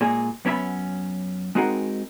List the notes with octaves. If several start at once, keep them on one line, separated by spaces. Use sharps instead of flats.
A#2 G#3 G#4
F#2 B3 C#4 D4 E5 B5
G#3 C4 D#4 F#4 G#4 A#4